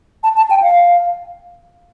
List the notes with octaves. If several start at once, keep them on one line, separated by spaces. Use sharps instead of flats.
A5
A5
G5
F5